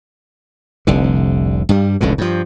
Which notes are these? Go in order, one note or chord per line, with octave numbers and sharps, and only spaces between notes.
F1 C2 D3
G2 G3
F1 C#2 A2 D3
G2 F3